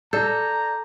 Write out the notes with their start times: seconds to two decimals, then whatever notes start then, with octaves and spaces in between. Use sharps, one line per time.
0.13 A4 D5 A#5 G6